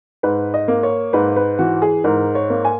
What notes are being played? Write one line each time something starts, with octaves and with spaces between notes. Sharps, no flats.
G#2 B4
D#5
A#3
C#5
G#2 B4
B4
E3 F#4
G#4
G#2 A#4
C#5
A#3
G#5